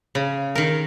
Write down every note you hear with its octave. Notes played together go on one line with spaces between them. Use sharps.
C#3
D#3 A#4